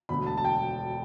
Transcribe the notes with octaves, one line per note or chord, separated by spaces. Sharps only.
E1 D2 D3 B5
A5
A5
G5